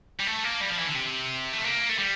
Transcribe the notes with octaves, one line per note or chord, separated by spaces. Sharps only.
G3
A3
A#3
G3
F3
E3
D3
C3
A3
A#3
A3
G3